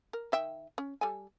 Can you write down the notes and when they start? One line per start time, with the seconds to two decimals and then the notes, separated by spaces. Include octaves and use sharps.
0.13 A#4
0.32 D#3 E5 G5
0.78 C#4
1.01 G3 A4 G#5